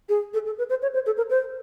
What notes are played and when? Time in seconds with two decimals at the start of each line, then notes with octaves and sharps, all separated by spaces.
0.09 G#4
0.34 A4
0.46 A4
0.58 B4
0.70 C5
0.82 C#5
0.94 C5
1.06 A4
1.17 A#4
1.30 C5